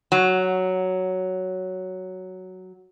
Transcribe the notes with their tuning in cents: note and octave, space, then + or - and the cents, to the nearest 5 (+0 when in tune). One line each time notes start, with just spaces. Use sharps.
F#3 +5